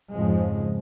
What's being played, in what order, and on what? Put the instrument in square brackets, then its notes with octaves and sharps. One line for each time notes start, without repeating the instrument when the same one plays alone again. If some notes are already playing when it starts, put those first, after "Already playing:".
[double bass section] F2 G#2 C#3 F3 G#3